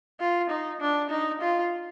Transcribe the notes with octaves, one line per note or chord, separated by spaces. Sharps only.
F4
D#4
D4
D#4
F4